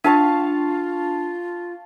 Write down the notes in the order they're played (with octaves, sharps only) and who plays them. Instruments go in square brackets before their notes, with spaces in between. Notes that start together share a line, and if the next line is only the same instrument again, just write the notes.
[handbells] D4 [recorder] F4 [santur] F5 A5 C#6